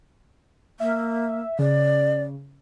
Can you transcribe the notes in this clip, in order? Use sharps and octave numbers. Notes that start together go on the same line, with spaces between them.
A#3 E5
C#3 D5